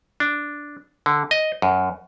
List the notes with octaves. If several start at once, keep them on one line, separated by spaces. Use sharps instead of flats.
D4
D3
D#5
F#2